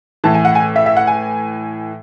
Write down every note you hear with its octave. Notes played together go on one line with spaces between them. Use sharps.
A2 E3 A5
G#5
F#5
G#5
E5
E5
F#5
G#5